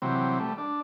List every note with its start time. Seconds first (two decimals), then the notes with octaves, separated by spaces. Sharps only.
0.02 C3 E3 F#3 G3 C4
0.40 G3 A3
0.58 D4